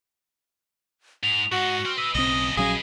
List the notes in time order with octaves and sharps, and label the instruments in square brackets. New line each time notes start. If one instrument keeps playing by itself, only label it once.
[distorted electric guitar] G#2 [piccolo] F7
[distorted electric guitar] G#2 D#4 [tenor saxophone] F#4 [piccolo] F#5
[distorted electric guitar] C4 [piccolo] F6
[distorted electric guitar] B4 D#5 [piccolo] E6
[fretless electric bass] B1 C4 [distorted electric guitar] A2 C#3 [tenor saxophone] D#5 [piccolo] D#6
[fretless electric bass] A#1 F#3 C#4 [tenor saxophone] G#4 [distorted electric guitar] B4 D#5 [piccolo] F5